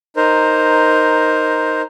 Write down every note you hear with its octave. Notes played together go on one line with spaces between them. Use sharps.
D#4 A#4 C5